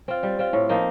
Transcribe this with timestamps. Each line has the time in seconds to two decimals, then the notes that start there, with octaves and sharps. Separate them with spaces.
0.08 C4 F4
0.23 G3
0.39 C4 F4
0.53 A2
0.69 F3 A#3 D#4